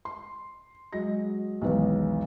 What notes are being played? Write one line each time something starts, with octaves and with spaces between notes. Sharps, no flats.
C6
F#3 G#3 D#5 A#6
B1 E2 G#2 D#3 G#3 B3